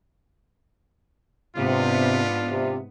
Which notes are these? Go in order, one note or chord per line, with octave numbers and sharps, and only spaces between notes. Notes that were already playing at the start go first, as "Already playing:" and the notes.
G#2 C3 B3 D4 F4
C3